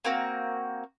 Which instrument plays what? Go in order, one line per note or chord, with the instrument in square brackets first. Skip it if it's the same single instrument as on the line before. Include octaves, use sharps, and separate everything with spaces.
[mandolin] A#3 C4 F#4